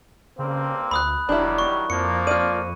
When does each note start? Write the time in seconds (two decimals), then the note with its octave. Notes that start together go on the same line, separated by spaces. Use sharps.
0.39 G2 C#3 A#3 C4
0.91 D2 B5 D#6 F#6
1.29 E1 D#3 F#3 G3 D4 E4
1.58 C#6
1.90 F2 F3 A#3 C#7
2.27 F4 D5 D#7